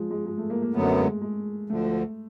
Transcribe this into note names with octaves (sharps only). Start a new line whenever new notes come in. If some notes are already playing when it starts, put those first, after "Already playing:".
Already playing: F3 G#3
G#3
G#3
A3
A#3
A#3
F#2 D3 F#3 A3 B3
G#3
G#3
D2 D3 F3 A3